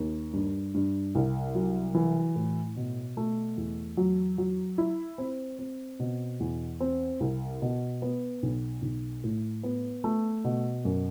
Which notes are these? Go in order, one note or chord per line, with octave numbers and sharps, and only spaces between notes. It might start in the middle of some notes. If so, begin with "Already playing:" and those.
Already playing: D#2
G2
G2
C2
F#3
E3
A2
B2
A3
E2
F#3
F#3
E4
C4
C4
B2
E2
C4
C2
B2
B3
B1
B1
A2
B3
A3
B2
F#2